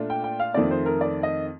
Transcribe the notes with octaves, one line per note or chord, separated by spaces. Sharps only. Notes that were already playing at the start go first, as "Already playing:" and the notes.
Already playing: A#2 A3 D4 F4
G5
G5
F5
F2 D#3 A3 C4 D5
C5
A#4
D5
D#5